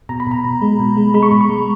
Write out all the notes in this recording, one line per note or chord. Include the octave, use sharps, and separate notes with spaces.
B2 A#5
B5
B2 A#5
B2
G#3
B2
G#3
G#3 B5
C#6
B2 B5
C#6
G#3